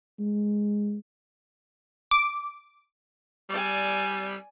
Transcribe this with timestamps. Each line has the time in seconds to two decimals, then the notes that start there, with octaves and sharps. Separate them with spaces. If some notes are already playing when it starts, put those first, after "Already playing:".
0.20 G#3
2.11 D6
3.50 G3 D5 G#5